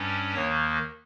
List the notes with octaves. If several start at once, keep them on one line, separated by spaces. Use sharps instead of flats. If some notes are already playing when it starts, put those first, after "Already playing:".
Already playing: G2 G3 C#4
D#2 D#3 A#3 C#5